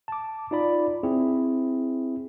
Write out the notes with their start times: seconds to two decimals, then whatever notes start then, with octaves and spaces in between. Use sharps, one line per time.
0.08 A5 D6
0.51 D#4 F4 D5 B5
1.03 C4 E4 G#4